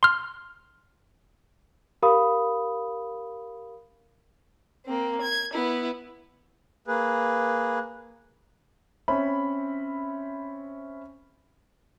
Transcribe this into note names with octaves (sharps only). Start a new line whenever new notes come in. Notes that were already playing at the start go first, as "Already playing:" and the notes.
C6 F6
G4 A#4 F5 B5 D#6
A#3 C4
G#6
B3 E4
A#3 G#4 B4
C4 C#4 C5 C#5 E5 B5